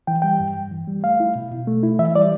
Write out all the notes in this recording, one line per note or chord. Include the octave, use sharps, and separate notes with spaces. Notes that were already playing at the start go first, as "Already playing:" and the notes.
E3 G5
G3 G5
G2
G2
E3
G3
A3 F5
E4
B2
B2
A3
E4
E3 E5
G3 D5